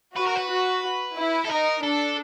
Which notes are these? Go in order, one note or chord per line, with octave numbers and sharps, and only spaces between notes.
F#4 B4
A#4
B4
F#4
E4
A4
D#4 A#4
D4 A4